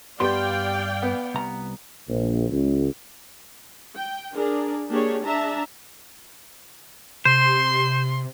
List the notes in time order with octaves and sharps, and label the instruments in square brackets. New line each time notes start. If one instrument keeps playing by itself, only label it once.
[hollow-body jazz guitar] G2 G4 C6 [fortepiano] G3 B3 [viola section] D5 F5 G5
[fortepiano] B3
[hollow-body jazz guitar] C2 A#5
[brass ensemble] A#1
C#2
[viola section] G5
D4 G#4 A#4 D5
A#3 D4 G4 G#4 C#5
D4 G#4 E5 A5 A#5
[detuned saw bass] C3 [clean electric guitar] C5 [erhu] C6